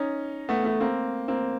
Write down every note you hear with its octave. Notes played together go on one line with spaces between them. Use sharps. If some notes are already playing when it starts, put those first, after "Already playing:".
Already playing: C#4 D#4
A3 B3
A3 B3
A#3 C4
A#3 C4